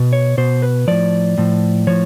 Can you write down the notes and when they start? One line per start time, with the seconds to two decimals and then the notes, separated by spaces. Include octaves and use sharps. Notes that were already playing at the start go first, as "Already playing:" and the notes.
Already playing: B2
0.13 C#5
0.37 B2 C5
0.62 B4
0.88 A2 F3 D5
1.38 A2 F3
1.87 A2 F3 C#5